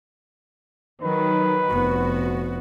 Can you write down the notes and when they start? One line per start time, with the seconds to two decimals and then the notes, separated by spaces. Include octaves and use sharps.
1.02 D#3 F#3 B4
1.71 F1 B3 F#4